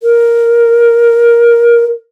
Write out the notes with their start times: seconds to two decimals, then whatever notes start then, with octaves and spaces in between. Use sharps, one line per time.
0.03 A#4